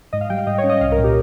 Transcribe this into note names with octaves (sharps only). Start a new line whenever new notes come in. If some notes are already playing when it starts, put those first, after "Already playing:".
G#2 D#5
F5
G3 G5
F5
G#2 D#5
C#5
C#4
D#5
C2 F5
A#4
A#2
G4